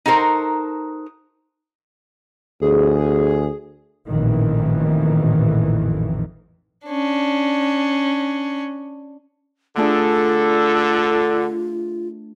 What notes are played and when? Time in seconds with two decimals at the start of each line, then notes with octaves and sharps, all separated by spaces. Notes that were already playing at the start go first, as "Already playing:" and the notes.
0.06 D#4 F#4 A4 A#4 C5
2.62 D2 G#4
4.09 A1 F2 A#2 D#3 E3
6.87 C#4 D4
9.77 D3 A3 D4 F4 G#4 A4